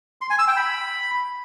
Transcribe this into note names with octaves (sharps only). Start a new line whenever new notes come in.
C6
G#5
E6
G5
B5